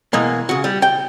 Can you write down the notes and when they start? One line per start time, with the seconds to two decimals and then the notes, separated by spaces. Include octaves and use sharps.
0.13 B2 E3 G#3 A#3
0.49 C#3 F#4
0.64 G3
0.82 G5